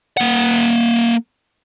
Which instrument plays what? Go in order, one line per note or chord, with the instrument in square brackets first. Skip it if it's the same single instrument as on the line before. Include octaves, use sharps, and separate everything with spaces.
[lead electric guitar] A#3 F#5